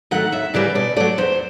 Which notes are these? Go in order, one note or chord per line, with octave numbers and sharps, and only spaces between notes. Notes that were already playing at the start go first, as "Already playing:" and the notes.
D#3 F#3 A3 F#5
D#2 E5
C#3 E3 G3 A#3 D5
B2 D5
F#3 A3 D5
E2 C5